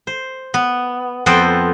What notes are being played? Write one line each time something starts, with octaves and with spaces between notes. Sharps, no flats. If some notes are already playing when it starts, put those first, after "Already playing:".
C5
B3
F2 B3 A4 C5 G5